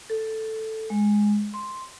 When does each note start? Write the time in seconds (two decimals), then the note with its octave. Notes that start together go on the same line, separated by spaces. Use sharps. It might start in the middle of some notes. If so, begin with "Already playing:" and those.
0.10 A4
0.90 G#3
1.54 C6